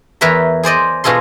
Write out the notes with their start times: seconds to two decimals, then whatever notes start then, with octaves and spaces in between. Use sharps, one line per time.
0.21 E2 A#4 B4 C#5 E5 A#5
0.63 G#4 C5 D5 D#5
1.04 B2 F4 G#4 A4 C6